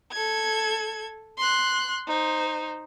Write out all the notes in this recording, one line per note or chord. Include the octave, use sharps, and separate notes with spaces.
A4 G#6
C6 F#6
D#4 C5